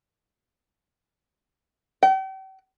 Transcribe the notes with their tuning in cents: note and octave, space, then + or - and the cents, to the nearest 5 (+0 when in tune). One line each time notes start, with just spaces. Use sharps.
G5 -40